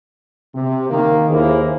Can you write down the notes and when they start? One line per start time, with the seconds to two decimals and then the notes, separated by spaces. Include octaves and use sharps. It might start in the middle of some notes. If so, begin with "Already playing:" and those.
0.55 C3
0.90 D#3 A#3
1.30 D#2 A#3 E4 G#4 C5